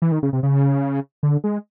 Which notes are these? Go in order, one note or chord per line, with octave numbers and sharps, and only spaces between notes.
E3
D#3
C#3
C3
C#3
D3
G#3